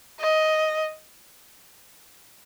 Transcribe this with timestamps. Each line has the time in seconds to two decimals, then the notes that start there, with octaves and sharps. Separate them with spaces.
0.21 D#5